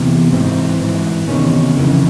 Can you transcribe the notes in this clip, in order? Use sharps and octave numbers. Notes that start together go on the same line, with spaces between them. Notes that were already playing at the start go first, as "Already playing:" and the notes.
Already playing: E2 C3 E3
G#2 E3 C4
G#2 E3
E2 C3 D#3 C#4
F2 C#3 E3